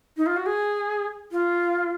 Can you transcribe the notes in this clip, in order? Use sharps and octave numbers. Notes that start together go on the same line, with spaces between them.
D#4
F4
F#4
G#4
F4